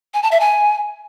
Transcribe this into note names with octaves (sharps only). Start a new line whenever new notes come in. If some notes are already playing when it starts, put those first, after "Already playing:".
G#5
A5
E5
G#5